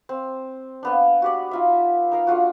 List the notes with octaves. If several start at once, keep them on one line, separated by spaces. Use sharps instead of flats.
C4
A#3 B3 D4
F#4 G4 D5
D#4 F4 E5
D#4 A#4 F5
A3 D4 F4 F#4